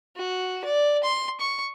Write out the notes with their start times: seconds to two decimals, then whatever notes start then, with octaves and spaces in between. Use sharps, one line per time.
0.16 F#4
0.64 D5
1.04 C6
1.40 C#6